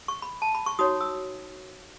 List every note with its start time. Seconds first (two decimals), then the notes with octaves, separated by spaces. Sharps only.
0.08 C#6
0.22 B5
0.42 A5
0.55 B5
0.66 C#6
0.79 D#4 F#4 C#5 D#6
1.01 E6